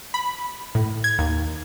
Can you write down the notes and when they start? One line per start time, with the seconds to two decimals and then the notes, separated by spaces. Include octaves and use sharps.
0.14 B5
0.75 A2
1.04 G#6
1.19 D#2